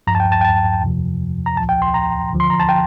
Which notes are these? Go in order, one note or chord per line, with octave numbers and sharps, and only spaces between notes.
G2 F3 A#5
A5
G5
A5
G5
A5
F2 C3 F3
A#5
C2 A#2 F3 A5
G5
C6
A#5
D2 D3 F3
C6
A#5
A5
G5